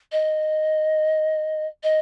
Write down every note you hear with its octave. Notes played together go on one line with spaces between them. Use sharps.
D#5
D#5